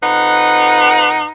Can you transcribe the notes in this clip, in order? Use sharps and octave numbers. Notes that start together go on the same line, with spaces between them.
F2 D#4 B4 F#5